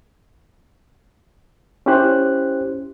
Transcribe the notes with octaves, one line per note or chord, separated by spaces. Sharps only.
C#4 E4 G4 C5 F#6